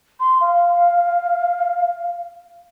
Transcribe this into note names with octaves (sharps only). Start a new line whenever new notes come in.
C6
F5